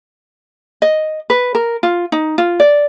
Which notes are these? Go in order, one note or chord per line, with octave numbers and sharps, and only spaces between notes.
D#5
B4
A#4
F4
D#4
F4
D5